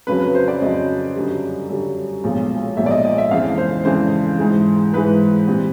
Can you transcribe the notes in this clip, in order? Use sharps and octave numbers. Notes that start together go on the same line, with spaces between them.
F2 C#3 F#3 B4
B4
C5
D5
F2 C#3 F#3 D#5
F#2 D3 G3
F#2 D3 G3
B1 A#2 F3 G#3
B1 A#2 F3 G#3 E5
D5
D#5
D#5
E5
F2 C#3 E3 G#3 C4 F5
C5
F2 C#3 E3 G#3 C4 C5
G#2 E3 G#3
G#2 E3 G#3 B4
A#2 G3 C4